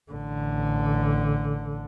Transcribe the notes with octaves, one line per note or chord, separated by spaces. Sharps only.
A1 D3